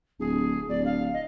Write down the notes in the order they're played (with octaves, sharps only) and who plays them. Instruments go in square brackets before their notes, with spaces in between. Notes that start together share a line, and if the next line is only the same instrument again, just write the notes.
[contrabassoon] D1 [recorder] G#4
[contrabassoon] D1 [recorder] D5
[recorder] F5
D#5